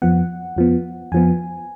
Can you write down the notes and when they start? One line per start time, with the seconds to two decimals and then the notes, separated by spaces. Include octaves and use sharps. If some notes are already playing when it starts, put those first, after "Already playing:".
0.02 F2 F3 B3 F#5
0.56 F2 F3 B3
1.12 F2 F3 B3 G#5